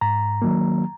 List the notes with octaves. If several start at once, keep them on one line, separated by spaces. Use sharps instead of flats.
G#2 A#5
D#3 F#3 A#3